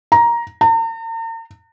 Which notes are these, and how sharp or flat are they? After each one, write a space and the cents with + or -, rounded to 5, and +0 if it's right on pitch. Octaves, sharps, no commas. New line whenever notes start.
A#5 +10
A#5 -45